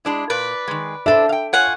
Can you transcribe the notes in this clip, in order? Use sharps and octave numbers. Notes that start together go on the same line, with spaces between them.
G#3 D4 E4
A#2 B4 D5
D#3 G#3
D4 A4 C5 E5
F5 G5
F4 C#5 F#5 G#5